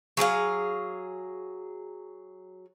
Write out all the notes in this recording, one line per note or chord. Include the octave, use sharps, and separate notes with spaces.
F#3 G#4 D5 F5